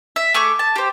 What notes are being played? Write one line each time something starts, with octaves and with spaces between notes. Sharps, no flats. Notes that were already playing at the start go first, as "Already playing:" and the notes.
E5
A3 G#4 C#6 D6
A5
G4 C5